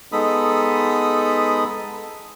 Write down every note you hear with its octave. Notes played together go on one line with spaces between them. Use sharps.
G#3 B3 D#4 A4 B5 D#6